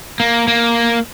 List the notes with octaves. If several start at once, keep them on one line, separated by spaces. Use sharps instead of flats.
A#3
A#3